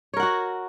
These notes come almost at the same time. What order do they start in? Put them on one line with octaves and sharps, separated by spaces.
C#5 A#4 F#5 F#4